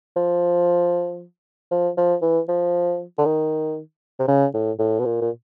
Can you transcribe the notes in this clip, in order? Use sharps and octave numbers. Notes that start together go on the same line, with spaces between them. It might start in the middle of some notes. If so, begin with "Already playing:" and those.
F3
F3
F3
E3
F3
D3
D#3
C3
C#3
A2
A2
B2
A#2
A#2